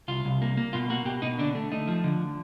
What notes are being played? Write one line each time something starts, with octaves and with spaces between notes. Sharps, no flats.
C2 F4
C2
A#3
A#3
B2 F4
A#3 F#4
B2 G4
B2 D#4
D3 D4
A3
A3 D#4
F3
D3